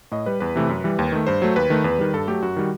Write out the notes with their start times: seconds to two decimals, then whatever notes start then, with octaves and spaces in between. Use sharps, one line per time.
0.12 A2 D#5
0.26 G3 B4
0.40 E2 B4
0.56 C3 E3 A3
0.69 F#2
0.84 E3 G3
0.99 D#2
1.12 D#3 A3
1.27 G2 C5
1.42 F#3 A3
1.56 D#2 B4
1.70 D#3 A3
1.84 E2 B4
1.98 D#3 G3
2.13 G2 A4
2.28 F#3 A3 G4
2.42 F#2 F#4
2.56 D#3 G3